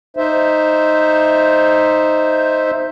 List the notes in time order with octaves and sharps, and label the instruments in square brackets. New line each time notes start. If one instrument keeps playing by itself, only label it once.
[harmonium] D#4 C5 E5